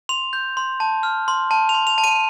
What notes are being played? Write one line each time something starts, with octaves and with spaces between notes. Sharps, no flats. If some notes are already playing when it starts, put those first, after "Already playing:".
C6 F7
G6
C6
A5
F6
C6
A5
F7
C6
F7
A5
D#7